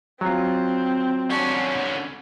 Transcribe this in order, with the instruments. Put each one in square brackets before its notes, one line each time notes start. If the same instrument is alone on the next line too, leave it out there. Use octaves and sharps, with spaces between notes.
[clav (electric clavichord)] F#3 F4 [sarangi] C4
[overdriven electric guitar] D3 C#4 [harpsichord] D4 F#4